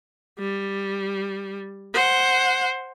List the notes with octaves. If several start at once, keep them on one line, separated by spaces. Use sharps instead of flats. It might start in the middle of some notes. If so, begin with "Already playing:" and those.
G3
C5 F#5